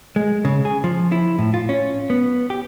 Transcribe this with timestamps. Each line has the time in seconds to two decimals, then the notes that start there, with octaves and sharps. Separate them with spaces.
0.16 G#3
0.45 C#3
0.65 G#4
0.84 F3
1.12 E4
1.38 A2
1.54 F4
1.69 C#4
2.10 B3
2.50 G4